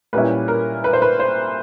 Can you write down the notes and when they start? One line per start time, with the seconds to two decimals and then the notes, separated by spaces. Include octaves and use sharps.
0.13 A#2 G3 A#3 C#4 E4 B4
0.48 A#4
0.84 B4
0.93 C5
1.02 B4
1.19 C5